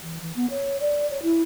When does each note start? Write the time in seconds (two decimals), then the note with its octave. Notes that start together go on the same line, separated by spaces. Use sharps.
0.03 E3
0.21 E3
0.36 B3
0.50 C#5
0.80 D5
1.10 C#5
1.23 E4